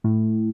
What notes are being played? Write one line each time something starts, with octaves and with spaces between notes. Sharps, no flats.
A2